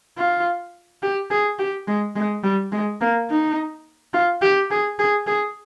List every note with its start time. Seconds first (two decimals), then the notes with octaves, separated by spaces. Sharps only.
0.18 F4
1.03 G4
1.31 G#4
1.59 G4
1.87 G#3
2.16 G#3
2.44 G3
2.72 G#3
3.01 A#3
3.29 D#4
4.14 F4
4.42 G4
4.71 G#4
4.99 G#4
5.27 G#4